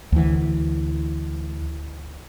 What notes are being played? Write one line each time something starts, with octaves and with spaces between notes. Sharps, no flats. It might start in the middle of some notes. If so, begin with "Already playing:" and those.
D2 E3